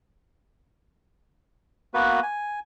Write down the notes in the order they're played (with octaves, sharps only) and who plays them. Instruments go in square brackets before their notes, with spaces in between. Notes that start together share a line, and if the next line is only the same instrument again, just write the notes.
[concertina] A#3 B3 F#4 B4
G#5